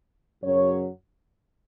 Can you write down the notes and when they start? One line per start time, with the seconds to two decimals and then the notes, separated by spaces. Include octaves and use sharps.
0.43 F#2 C#3 F#3 C#5